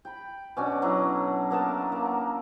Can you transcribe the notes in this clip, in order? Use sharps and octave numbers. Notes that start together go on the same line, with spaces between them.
G5 B5
B2 C#4 D4 F#4
F#3 E4 A4
A#3 B3 A#4 A5
A#3